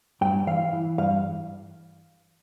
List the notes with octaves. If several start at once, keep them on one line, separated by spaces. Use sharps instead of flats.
G2 G5
E3 F5
E3
G2 F5